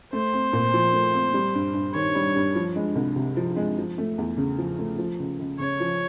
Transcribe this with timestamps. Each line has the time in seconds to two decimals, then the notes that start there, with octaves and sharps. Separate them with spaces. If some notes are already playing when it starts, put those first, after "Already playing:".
0.13 A3 C5
0.33 C4
0.53 A#2
0.74 F3
0.93 A3
1.14 C4
1.34 G3
1.55 G2
1.74 G2
1.94 D#3 C#5
2.15 G3
2.36 G2
2.55 F3
2.76 G#3
2.96 C2
3.16 C3
3.37 F3
3.56 G#3
3.78 F3
3.98 A3
4.18 E2
4.37 C#3
4.58 F3
4.79 A3
4.98 F3
5.20 C#2
5.39 C#2
5.59 C#3 C#5
5.80 F3